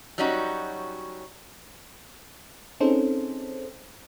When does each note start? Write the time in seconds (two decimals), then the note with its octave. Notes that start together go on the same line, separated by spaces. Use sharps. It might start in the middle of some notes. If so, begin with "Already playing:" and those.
0.18 F#3 G3 C#4 D#4 F#4
2.80 C4 C#4 D#4 G#4 A4 C5